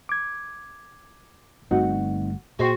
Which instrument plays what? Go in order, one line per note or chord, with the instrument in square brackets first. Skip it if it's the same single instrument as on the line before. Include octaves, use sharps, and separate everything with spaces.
[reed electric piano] D6 G#6
[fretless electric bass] G1 G2 A3 [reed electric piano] C4 D#4 [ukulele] F#4
[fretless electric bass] A#2 [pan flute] F#4 [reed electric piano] G#4 C5 C6 [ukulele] D#5 G5